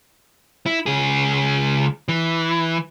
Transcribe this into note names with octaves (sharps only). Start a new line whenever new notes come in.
E4
C#2 G#4
E3